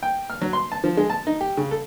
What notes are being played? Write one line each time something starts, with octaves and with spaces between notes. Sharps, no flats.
G5
F6
F#3
C6
A5
F3
G#3
A5
D#4
G4
C#3
A4